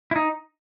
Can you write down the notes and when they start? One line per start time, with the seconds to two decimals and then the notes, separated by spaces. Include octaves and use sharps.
0.11 E4
0.16 D#4